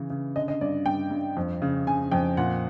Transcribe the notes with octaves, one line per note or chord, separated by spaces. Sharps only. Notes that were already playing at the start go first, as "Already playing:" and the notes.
Already playing: C#3 E3
C#3
D3 D#5
D#5
G2 D5
G2 G5
G2
F2
C#3
C#3 G#5
F2 G5
A#2 F#5